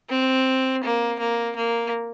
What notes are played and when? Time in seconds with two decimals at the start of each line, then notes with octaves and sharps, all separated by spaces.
0.10 C4
0.84 A#3
1.19 A#3
1.56 A#3